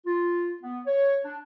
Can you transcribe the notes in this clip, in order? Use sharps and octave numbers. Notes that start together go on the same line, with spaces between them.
F4
B3
C#5
D4